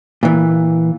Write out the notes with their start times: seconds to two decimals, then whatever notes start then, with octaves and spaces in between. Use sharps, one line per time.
0.23 A#2 E3